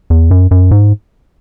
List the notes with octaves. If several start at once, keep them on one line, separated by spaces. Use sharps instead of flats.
E2
F#2
F#2
G#2